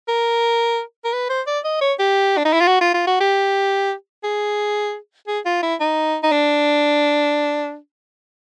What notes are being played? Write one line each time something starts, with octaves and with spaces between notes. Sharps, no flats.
A#4
A#4
B4
C5
D5
D#5
C#5
G4
D4
D#4
E4
F4
F#4
F4
F4
F#4
G4
G#4
G#4
F4
E4
D#4
D#4
D4